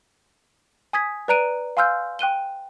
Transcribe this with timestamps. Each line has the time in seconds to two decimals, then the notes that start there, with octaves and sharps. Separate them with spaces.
0.93 G#5 D#6 G#6 B6
1.28 B4 D5 A#5 F#6 D7 D#7
1.77 F5 G#5 C6 E6 F6 G6
2.19 G5 F#6 D#7 G7